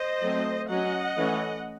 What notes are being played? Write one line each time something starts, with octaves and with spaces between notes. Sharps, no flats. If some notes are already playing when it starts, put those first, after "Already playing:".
Already playing: C5 D#5
F#3 A3 C4
F#3 C#4 D#5 F#5
E3 A3 C#4